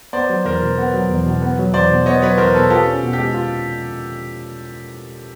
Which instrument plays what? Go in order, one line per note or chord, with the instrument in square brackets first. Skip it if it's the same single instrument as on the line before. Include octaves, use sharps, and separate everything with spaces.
[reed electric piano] B3 [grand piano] C5 D5
[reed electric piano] F#3
[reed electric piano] E2 [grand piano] A#4 C5
[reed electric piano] B2
B3
F#3
E2
B2
B3
F#3
[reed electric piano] E2 [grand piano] C5 D5
[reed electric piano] B2
[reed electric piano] B3 [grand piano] C#5 D#5
[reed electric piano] F#3 [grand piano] B4 C#5
[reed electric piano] E2 [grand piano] A#4 C5
[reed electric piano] B2 [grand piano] A4 B4
[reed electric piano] F4 [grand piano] G4 A4
[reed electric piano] C#4
B2
[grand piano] G4
[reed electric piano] G#3
F4